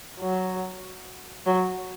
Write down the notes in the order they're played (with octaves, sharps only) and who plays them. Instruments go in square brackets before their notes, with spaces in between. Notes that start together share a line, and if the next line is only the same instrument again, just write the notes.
[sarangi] F#3
F#3